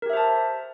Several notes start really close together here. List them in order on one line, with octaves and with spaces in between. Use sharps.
A#4 G4 E5 C5 A5